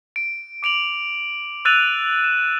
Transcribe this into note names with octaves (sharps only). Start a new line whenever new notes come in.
D7
D6 D7 F7 F#7
E6 F#6 A6 D#7 F7
E7